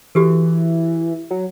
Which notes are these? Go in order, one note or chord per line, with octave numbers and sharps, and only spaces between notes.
E3 F#4 G4 A4
F#3